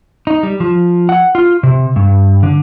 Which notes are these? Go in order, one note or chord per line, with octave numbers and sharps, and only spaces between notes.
D#4
G3
F3
F#5
F4
C3
G2
D3